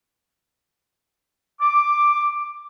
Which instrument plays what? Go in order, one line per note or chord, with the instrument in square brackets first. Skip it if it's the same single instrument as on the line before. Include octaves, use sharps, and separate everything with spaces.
[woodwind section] D6